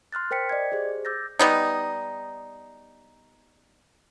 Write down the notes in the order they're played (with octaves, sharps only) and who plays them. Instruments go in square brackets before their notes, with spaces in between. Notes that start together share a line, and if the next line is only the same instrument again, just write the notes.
[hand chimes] C6 F6 F#6 A6
A#4 C5 G5 B6 C#7
D5 D#5 G#6
G4 G#4 C5
D6 E6 G6 A6 A#6
[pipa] G3 B3 D#4